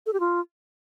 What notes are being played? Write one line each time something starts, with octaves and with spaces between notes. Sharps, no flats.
A4
G4
F4